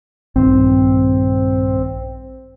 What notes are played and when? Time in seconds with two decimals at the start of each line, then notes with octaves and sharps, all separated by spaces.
0.36 A#1 G2 D#3 C4